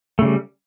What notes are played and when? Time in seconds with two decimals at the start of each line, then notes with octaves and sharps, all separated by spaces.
0.19 A3
0.22 C#3
0.25 G3